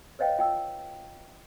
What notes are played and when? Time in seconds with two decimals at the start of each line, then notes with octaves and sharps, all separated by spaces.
0.19 B4 C#5 D#5 F5 G5
0.39 F4 G5 E6